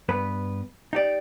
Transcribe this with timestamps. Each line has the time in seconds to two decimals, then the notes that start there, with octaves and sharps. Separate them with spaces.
0.09 G2 B3 B4
0.93 D#4 G4 D5